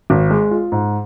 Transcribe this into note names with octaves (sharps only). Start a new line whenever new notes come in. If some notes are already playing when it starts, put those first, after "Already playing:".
G#1
G#3
F4
G#2